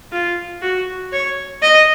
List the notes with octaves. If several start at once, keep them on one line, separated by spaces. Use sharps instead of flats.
F4
F#4
C#5
D#5